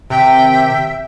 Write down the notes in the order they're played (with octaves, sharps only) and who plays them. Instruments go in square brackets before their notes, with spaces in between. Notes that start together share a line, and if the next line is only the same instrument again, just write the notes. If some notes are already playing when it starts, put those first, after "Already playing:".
[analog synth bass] C3 [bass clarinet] D#3 [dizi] E5 [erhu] G5